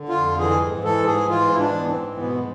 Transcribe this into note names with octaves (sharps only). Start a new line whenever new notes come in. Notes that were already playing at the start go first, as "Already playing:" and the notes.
Already playing: D3
F4
F2
E3 G#4
G#2
E3 A4
G#2 G#4
E3 F4
G#2 E4
D4
E3 B3
C4
G#2
B2 B3